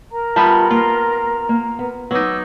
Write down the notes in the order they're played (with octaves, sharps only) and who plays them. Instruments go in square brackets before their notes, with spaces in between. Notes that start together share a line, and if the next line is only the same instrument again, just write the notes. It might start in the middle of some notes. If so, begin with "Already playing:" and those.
[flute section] A#4 A#5
[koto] G3 B3 [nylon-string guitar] F4 E5 A5
[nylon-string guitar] A#3 [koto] F4
[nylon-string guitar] A#3
B3
[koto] F#3 D#4 [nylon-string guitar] B3 [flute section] D6 E6